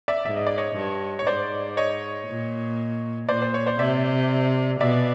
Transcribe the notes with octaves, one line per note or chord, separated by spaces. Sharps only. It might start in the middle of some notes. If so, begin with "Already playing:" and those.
D5 E5
G#2 E5
D#5
D5
C#5 D#5
G2
C#5
G#2 C5 D5
C#5 D#5
A#2
A#2 C5 D5
C5
C#5
C5 D5
C3 D5 E5
B2 D5 E5